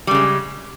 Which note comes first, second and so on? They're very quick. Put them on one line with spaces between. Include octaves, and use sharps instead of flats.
G3 C#3 G#3